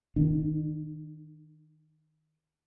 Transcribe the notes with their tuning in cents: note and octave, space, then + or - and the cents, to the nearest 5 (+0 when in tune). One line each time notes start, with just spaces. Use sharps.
D#3 +0 D4 +45